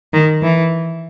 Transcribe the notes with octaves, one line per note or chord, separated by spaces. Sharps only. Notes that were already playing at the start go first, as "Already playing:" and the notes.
D#3
E3